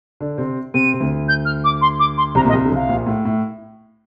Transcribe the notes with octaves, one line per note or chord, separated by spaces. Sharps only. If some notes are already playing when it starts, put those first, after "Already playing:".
D3 D4
C3 C4
C3 C4 D#7
C3
D2 D3
G6
F6
D6
C6
D6
C6
C2 C3 A#5
A#2
D#5
C2 C3
D3
C2 C3 F5
A#1 A#2
A2
A2